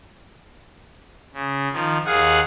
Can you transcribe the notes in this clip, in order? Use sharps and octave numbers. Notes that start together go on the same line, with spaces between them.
C#3
D#3 F3
D#2 G#4 F5 F#5 F#6